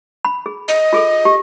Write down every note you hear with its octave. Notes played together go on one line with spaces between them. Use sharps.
B5
G#4
D#5
F4 G#4 A4
G4